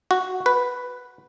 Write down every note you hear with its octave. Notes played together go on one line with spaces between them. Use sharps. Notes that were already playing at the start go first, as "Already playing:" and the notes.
F#4
B4